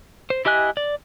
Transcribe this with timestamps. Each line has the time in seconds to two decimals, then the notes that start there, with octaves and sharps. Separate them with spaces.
0.30 C5
0.45 E4 G4 D#5 G#5 F#6
0.77 D5